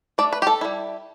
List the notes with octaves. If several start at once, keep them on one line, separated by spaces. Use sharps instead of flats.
A3 D4 D5
B4
G4
A4
G3 E4